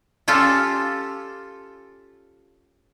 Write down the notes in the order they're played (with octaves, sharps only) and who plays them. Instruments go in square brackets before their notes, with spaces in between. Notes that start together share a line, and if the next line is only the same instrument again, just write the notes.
[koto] C#4 F4 G4 A4